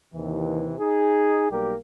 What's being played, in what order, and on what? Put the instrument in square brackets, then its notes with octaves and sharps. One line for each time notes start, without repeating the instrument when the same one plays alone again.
[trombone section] D#2 C3 E3
D#4 G#4
B1 G3 A#3 G4 A#4